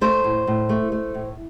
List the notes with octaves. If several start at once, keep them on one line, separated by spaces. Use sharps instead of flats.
A3 C5
A2
A2
A3
A3
A2